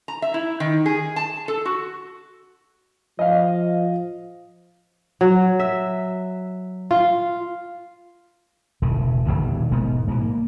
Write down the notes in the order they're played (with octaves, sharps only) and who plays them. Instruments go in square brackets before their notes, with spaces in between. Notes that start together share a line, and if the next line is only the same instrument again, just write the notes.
[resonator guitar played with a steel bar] A#5
E5
E4
D#3
G#4
A5
A4
F#4
[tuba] F3 [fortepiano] D#5 F5
[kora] F#3
E5
F4
[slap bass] E1 A2 C#3
D#1 B1 B2 D3
E1 G#2 B3
G#2 B2 D3 E3
A#3